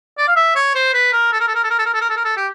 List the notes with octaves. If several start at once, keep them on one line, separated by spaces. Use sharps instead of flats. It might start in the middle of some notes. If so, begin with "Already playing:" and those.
D5
F5
E5
C#5
C5
B4
A#4
A4
A#4
A4
A#4
A4
A#4
A4
A#4
A4
A#4
A4
A#4
A4
G4